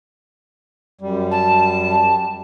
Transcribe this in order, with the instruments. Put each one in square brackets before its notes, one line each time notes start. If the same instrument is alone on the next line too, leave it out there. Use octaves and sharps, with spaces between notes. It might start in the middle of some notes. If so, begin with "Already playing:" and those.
[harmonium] F#2 G3
[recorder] A5